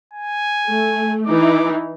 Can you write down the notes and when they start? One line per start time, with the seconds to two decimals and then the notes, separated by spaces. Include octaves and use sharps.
0.13 G#5
0.67 A3
1.26 E3 D#4 D6